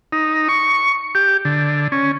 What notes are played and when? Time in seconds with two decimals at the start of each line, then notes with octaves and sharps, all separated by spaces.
0.12 D#4
0.49 C#6
1.15 G4
1.45 D3
1.92 C#4